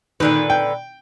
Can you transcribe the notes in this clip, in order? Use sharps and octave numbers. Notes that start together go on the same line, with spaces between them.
A#2 D3 D#3 B4
G5